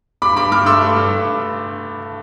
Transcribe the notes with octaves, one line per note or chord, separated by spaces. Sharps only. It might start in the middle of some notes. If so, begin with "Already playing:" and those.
G2 B5 D6
G2 B5 D6
G2 D6 F6
A3 C6 E6
G2
G2
G2